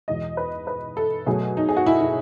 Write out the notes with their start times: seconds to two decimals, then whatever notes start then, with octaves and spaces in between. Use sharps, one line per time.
0.08 E2 B2 G#3 D#5
0.37 B4
0.67 B4
0.97 A4
1.27 B2 F#3 A3 G#4
1.57 D#4
1.69 G#4
1.77 F#4
1.86 E4
2.01 E4